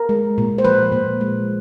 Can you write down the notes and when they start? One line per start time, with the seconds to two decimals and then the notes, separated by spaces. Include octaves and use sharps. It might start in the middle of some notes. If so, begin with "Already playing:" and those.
Already playing: A#4
0.09 G#3
0.38 A#2
0.58 C5
0.65 F3 B4
0.92 A#2
1.21 G#3